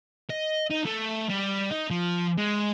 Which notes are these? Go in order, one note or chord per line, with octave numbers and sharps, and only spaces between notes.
D#5
D#4
A3
G3
D#4
F3
G#3